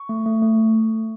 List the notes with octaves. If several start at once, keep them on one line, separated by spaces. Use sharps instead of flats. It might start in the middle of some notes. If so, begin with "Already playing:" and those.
Already playing: C#6
A3
A3
A3